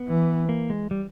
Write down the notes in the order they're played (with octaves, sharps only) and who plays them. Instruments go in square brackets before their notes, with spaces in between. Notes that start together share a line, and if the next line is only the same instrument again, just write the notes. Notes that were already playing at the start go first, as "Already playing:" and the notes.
Already playing: [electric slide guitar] B3
[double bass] E3
[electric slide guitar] A#3
G#3
G3